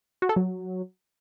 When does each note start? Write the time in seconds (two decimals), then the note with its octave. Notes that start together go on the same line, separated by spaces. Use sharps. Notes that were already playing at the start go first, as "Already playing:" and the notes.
0.22 F#4
0.29 A4
0.36 F#3